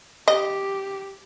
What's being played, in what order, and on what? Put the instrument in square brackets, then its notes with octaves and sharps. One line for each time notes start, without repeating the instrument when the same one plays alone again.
[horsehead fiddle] G4 [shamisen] D#5